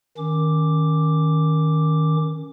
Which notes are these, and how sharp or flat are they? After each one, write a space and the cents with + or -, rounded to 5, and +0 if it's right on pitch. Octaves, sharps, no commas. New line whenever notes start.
D#3 +0 C#4 +0 D6 +0